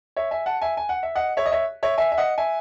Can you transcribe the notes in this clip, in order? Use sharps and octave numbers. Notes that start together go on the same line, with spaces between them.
C#5 E5
E5 G#5
F#5 A5
E5 G#5
G#5
F#5
E5
D#5 F#5
C#5 E5
D#5
C#5 E5
C#5 E5
E5 G#5
E5
D#5 F#5
E5 G#5